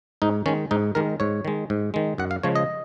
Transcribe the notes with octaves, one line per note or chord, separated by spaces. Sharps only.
G#2 D#4
D#3 G#3 C#4
G#2 D#4
D#3 G#3 A#4
G#2 C#5
D#3 G#3
G#2
D#3 G#3
F#2 F#5
F5
C#3 F3 G#3 C#5
D#5